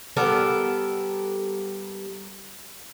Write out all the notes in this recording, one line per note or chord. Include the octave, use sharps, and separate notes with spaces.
G3 B3 A4 A#4